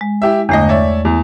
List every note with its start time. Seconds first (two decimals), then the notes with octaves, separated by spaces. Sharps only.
0.01 G#3
0.22 E4 G4 E5
0.49 G1 E2 A3 D#5
0.69 C#5 D5 E5
1.05 E2